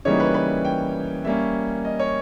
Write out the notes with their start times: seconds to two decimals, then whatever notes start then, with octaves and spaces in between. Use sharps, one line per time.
0.05 C#3 E3 G3 A#3 D#4 C#5
0.20 B4
0.34 B4
0.65 G5
1.25 G3 A#3 C#4 E5
1.85 D#5
1.99 C#5